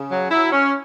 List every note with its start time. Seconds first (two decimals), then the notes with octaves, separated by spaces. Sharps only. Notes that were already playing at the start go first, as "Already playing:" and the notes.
Already playing: C#3
0.11 F#3
0.31 F#3 E4
0.52 C#4